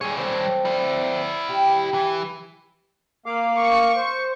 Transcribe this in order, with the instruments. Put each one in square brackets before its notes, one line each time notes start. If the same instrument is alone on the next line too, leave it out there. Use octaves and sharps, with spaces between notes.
[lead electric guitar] G3 C#5 [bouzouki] G#4 A4
[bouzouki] C4 A4
[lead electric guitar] E4 D5
[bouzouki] G4
[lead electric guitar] E3
[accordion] A#3 F5 D6
[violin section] C#6
[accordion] C5